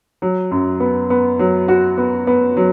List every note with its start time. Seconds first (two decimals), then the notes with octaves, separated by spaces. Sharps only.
0.22 F#3
0.51 F#2
0.80 B3
1.10 B3
1.39 F#3
1.68 F#4
1.98 B3
2.27 B3
2.57 F#3